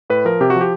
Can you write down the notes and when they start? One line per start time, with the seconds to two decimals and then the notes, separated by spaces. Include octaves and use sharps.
0.10 A2 B4
0.25 F3 A#4
0.41 C3 G4
0.50 F#4
0.55 F3
0.61 G4